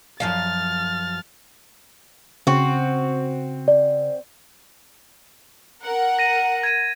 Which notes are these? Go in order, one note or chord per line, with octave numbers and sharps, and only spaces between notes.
F#2 F3 F5 F6 A6
C#3 C4 F#4
D5
A#4 F#5
A#6 D#7
G#6 D#7